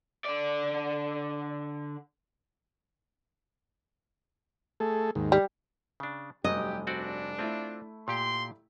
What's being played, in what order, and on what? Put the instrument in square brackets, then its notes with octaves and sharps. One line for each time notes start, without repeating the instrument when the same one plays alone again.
[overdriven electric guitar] D3 D5
[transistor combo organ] A3 G#4 A4
D#2 G#2
[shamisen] G3
[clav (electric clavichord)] C#3 D4
[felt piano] F1 G2 [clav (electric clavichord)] F#3 [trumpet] G4 [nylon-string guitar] D#5
[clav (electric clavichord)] C4 F#4 D5 [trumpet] D4
[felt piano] A3 E4 [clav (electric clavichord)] C4 F4
[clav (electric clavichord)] A#2 G4 G5 [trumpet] C6